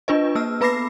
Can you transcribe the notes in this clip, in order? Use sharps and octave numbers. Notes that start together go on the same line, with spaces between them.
D4 F4 B4 D#5
A#3 E6 F6
B3 B4 B5 D6 A#6 C7